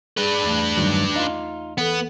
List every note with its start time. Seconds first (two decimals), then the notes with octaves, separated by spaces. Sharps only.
0.17 D4 G#4 B4
0.43 E2 E3 A3
0.77 G2 D#3 F#3
1.15 D#4 F4 F5
1.78 E3 B3 A4